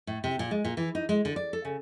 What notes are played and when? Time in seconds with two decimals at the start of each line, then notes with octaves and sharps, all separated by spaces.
0.07 A2
0.24 C3
0.39 A#2
0.51 G#3
0.65 A#2
0.77 E3
0.95 D#4
1.09 G#3
1.25 D3
1.36 D5
1.53 A4
1.65 C#3